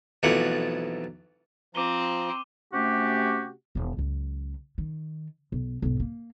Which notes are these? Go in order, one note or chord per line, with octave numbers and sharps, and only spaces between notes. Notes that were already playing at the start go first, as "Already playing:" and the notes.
B1 F2 E3 A3 F#5
F3 C4 A#5 D6 D#7 G7
C3 A3 C#4 F#4 G4
E1 D#3
C#2 F#2
D#3
B1
B1 G#2
A#3